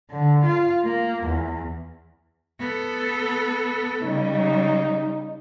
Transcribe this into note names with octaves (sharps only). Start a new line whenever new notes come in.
D3
F4
A#3
E2
B3 A4
C#3 G3 D#4